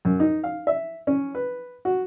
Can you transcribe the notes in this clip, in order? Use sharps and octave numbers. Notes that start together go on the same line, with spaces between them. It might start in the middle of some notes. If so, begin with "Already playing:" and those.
F#2
D#4
F5
E5
C#4
B4
F#4